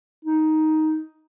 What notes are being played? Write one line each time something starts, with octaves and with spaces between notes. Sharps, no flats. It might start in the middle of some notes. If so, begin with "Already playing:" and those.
D#4